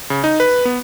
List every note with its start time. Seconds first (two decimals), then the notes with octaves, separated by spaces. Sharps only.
0.10 C#3
0.24 D#4
0.40 B4
0.65 B3